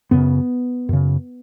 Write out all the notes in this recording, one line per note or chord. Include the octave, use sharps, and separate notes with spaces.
F#2 C#3 B3
F#2 C#3